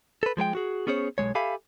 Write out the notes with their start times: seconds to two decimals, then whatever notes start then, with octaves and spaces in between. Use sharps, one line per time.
0.23 A4 B4
0.37 F3 G#3 A#4 G5
0.55 F#4 G#4
0.87 B3 C#4 G#4 C5 C#5
1.18 B1 C#3 G#3 C#5
1.35 G4 A4 E5 F5 G#5 B5